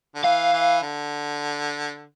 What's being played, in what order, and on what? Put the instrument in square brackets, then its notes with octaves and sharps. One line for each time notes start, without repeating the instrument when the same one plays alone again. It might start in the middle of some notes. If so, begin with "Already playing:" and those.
[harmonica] D3
[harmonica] E3 [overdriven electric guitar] F5
[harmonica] E3
D3